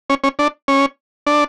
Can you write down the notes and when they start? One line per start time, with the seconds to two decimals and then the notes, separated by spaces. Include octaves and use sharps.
0.10 C#4
0.24 C#4
0.39 D4
0.68 C#4
1.27 D4